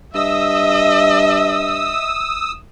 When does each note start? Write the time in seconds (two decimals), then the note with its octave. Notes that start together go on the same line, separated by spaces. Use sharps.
0.15 G2 D#5 E5 D#6 E6